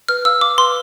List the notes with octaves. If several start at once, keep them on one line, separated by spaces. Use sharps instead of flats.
B4 F6
F5 E6
F5 D6
B4 C6